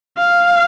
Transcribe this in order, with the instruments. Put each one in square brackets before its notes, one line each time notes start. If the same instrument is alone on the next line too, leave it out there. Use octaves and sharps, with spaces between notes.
[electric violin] F5